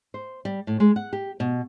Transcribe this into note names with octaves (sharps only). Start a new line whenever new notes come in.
C5
G3
A2
G#3
F#5
G4
B2